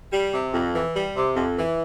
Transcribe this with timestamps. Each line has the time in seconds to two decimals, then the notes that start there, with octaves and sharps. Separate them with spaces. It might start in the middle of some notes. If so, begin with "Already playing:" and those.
0.12 G3
0.33 C3
0.54 F2
0.74 E3
0.95 G3
1.16 C3
1.36 F2
1.57 E3